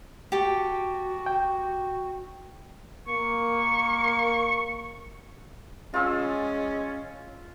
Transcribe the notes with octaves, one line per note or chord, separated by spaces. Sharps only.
F#4 G4 A4
G5
A#3 C#6
G#3 C#4 F4 E6